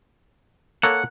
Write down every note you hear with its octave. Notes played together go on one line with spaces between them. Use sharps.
A#3 A4 C#5 F#5